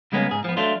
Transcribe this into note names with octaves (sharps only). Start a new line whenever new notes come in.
C#3 G3 G#3 A#3 B3 C#4
G#2 G#4
F3 B3
F#3 A3 D4 F4